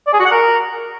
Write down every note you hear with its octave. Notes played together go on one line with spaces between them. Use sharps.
D5
G#4
F#4
F#5
A#4